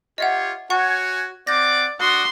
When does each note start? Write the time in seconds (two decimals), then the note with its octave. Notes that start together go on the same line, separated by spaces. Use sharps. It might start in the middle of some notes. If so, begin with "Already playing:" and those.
0.18 F4 G4 C#5 D#5 E5 F#5
0.70 F#4 C#5 F#5 G#5 C#6
1.47 C4 D5 F#5 D6 G6 A#6
2.00 D4 F#4 D5 C6 D#6